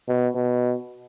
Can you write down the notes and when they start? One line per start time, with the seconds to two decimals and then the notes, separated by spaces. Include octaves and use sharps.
0.08 B2
0.35 B2